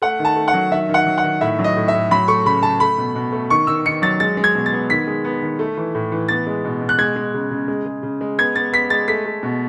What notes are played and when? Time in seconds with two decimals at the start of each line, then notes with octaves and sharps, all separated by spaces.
0.02 A3 F#5
0.19 D#3
0.25 A5
0.36 A3
0.48 F#5
0.54 F#3
0.71 D#3 E5
0.89 D#3
0.94 F#5
1.06 F#3
1.18 F#5
1.24 D#3
1.41 A2 E5
1.59 F#3
1.64 D#5
1.77 A2
1.88 E5
1.94 A2
2.11 F#3 B5
2.28 A3 C#6
2.45 C#3 B5
2.63 C#3 A5
2.80 A3 B5
2.98 B2
3.15 B2
3.32 A3
3.50 D#3 C#6
3.67 D#3 E6
3.85 D#3 C#7
4.02 F#3 A6
4.20 G#3 A6
4.37 G#3
4.44 G#6
4.55 B2
4.66 A6
4.72 B3
4.90 D#3 B6
5.07 G#3
5.24 B3
5.42 D#3
5.59 A3
5.77 E3
5.95 A2
6.12 E3
6.28 B3 A6
6.47 G#3
6.64 B2
6.81 B2
6.89 F#6
6.98 G#3 G#6
7.16 G#3
7.34 C#3
7.51 C#3
7.68 G#3
7.86 G#3
8.03 C#3
8.21 G#3
8.38 B3 G#6
8.55 B3 A6
8.72 B3 B6
8.90 G#3 A6
9.08 A3 B6
9.25 A3
9.43 B2